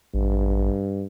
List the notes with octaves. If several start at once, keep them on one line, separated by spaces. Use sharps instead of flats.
A1 G2